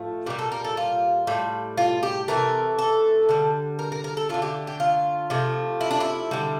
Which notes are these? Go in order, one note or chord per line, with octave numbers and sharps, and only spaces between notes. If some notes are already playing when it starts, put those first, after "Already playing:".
Already playing: A2 F3 A3
A#2 G3 G4
A4
A#4
A4
F4
A2 G3
F4
G4
C3 E3 A3 A#4
A4
D3 G3
A#4
A#4
A#4
A4
D3 A3 F4
G4
G4
F4
C3 F3 A3
E4
D4
E4
D3 G3